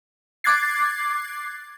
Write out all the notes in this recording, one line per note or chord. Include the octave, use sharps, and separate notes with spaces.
D6 F#6 G#6 A6 C7